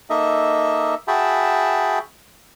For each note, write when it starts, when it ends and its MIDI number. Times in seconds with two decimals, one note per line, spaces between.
0.10 0.95 58
0.10 0.95 63
0.10 0.95 69
0.10 0.95 75
0.10 0.95 76
1.08 1.99 66
1.08 1.99 68
1.08 1.99 76
1.08 1.99 79
1.08 1.99 81
1.08 1.99 83